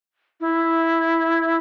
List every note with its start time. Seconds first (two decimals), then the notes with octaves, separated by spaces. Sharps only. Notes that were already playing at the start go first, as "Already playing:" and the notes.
0.40 E4